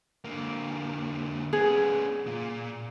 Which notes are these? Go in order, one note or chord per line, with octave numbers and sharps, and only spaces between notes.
D3 A#3
B3 C#4 G#4
A#2